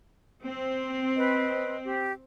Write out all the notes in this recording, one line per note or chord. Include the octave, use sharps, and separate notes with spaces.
C4
B4 D#5
G4